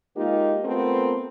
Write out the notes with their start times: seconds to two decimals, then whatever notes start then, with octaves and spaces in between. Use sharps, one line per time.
0.16 G#3 A#3 D#4 F4 G4 A#4
0.64 A3 B3 C4 F4 A4 A#4